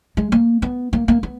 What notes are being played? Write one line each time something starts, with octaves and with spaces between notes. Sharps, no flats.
G#3
A#3
B3
A#3
A#3
B3